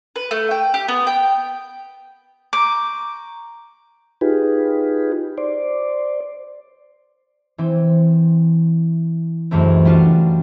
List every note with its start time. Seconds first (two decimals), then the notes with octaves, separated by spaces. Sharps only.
0.16 B4
0.31 A3
0.51 G5
0.74 G4
0.88 B3
1.07 G5
2.53 A#5 C#6 D6 G6
4.21 D#4 F4 G4 G#4 B4
5.38 C5 D5
7.58 E3 C4
9.51 C#2 F#2 E3 A3 C4
9.85 G3 D4 F4 F#4